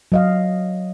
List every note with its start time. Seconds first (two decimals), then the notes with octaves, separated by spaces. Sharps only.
0.12 F#3 D#5 F5